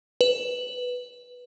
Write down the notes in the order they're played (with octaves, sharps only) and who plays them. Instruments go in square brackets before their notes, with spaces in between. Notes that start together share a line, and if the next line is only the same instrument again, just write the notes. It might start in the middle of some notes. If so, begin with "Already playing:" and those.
[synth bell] B4